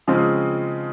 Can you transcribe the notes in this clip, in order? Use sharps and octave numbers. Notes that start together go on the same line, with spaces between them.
C#3 F3 G#3 C4